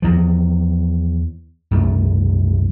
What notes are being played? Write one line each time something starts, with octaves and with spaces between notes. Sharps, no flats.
E2 F3
C2 F#2 A3